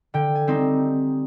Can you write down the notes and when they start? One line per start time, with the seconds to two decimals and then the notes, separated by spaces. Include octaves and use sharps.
0.14 D3 G5
0.35 G#5
0.47 G3 C4 D#4